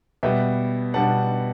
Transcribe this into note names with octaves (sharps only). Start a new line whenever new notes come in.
B2 G3 B3 E5 G5
B2 G3 B3 F#5 A5